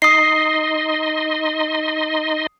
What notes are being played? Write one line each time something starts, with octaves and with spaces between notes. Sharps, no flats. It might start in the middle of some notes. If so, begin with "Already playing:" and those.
D#4 D#5 C6 D#6 C7